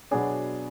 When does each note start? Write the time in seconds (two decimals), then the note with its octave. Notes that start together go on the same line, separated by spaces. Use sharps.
0.11 B2 F#3 B3 D4 G#4